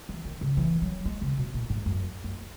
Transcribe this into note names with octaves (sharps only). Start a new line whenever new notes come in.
E3
D#3
C#3
E3
F#3
G#3
C#3
B2
A#2
G#2
F#2
F#2